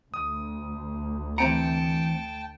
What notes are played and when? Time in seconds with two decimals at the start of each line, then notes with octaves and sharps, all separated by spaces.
0.14 D2 D#6
1.38 E3 C4 G5 A5 A#5 C#7 D7